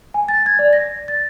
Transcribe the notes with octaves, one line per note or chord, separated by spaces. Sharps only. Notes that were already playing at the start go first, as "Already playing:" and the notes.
G#5
A6
G#6
D5
A#6
A6